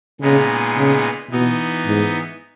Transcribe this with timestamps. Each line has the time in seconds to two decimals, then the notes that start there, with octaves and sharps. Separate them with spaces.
0.20 A#2 C#3 G#3 B3 D#4
0.76 C#3
1.30 B2 E3 B3 D#4
1.86 G#2